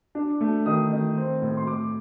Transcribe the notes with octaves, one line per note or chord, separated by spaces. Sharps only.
D4
A3
D#3 D#6
D#3
C4
A2
C6
A2 D6